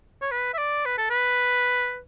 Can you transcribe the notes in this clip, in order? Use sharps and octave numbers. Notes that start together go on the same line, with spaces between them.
C#5
B4
E5
D5
B4
A4
B4